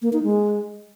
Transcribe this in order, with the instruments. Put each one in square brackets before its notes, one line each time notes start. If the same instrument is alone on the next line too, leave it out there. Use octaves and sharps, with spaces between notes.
[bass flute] A#3
D#4
G#3